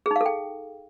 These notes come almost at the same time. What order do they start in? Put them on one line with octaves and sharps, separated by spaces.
G#4 D#4 F5 A4 G5